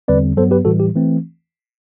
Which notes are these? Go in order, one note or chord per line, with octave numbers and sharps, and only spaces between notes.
E2 D3 G3 C4 B4 D5
G2 F#3 B3 A4 C5
G4 B4
A2 E3 G3 F#4 A4
G4
E3 A3 C4